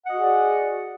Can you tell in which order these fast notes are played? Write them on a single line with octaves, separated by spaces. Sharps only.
F#5 D#5 F#4 G#4 D5